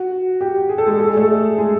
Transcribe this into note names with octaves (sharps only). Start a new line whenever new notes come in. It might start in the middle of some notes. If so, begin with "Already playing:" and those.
Already playing: F#4
G4
G#4
A4
G#3 G#4
A4
G#4
A3 A4
G#3 G#4